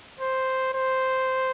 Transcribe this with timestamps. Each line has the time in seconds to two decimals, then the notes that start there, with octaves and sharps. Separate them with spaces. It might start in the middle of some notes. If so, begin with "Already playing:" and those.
0.19 C5
0.74 C5